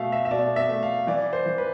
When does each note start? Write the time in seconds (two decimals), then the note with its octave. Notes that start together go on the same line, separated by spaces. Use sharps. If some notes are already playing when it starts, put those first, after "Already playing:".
Already playing: B2 A3 E5 F5
0.12 E5
0.25 E5
0.31 B2 D5
0.56 E5
0.69 A3
0.83 F5
1.07 E3 D5
1.33 C5
1.46 E3
1.58 B4